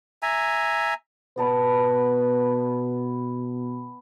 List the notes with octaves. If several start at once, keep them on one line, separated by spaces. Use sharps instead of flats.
E5 G#5 A#5
B2 B3 B4 A5 B5